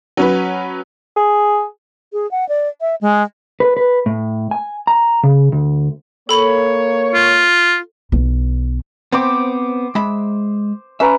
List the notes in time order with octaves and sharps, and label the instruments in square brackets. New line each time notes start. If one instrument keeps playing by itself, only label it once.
[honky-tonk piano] F#3 C#4 B4
[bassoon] G#4
[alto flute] G#4
F#5
D5
E5
G#3
[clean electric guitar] B4
B4
A2
G#5
A#5
C#3
D2
[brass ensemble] A#3 C#5 [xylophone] A4 B5 F#7
[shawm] F4
[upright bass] B1 E3
[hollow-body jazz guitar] B3 C4 [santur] C5 D6
[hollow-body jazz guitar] G#3 E5 B5
[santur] C#4 B4 A#5 [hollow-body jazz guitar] E5